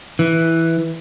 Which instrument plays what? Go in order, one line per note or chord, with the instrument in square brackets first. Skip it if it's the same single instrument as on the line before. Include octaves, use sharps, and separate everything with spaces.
[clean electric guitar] E3